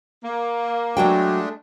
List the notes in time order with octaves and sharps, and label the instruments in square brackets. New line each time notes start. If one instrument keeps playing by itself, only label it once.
[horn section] A#3
[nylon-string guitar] F#3 F#4 G5 [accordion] G#3 A3 D4